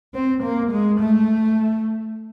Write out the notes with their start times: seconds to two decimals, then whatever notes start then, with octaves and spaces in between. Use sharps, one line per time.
0.14 C4
0.43 A#3
0.71 G#3
0.99 A3